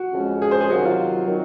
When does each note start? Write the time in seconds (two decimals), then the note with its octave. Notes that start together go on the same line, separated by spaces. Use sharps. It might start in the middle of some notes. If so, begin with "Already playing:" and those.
Already playing: F#4
0.13 F2 C#3 G#3 C#4
0.42 G#4
0.51 C5
0.61 G#4
0.70 C3 D#3 F#3 F#4
0.85 F4
1.28 D#3 F#3 C4 D#4 F#4